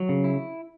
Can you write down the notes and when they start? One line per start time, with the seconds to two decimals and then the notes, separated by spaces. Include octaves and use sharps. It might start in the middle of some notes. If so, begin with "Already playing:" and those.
Already playing: F#3
0.09 C#3
0.24 E4